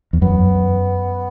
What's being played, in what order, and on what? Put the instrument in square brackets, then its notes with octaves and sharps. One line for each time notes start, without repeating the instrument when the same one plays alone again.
[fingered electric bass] E2
[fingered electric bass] F#2 [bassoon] B3